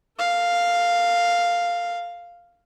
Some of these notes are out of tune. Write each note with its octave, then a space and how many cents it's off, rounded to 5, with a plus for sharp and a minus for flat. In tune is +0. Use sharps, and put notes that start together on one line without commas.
A#4 -45 F5 +0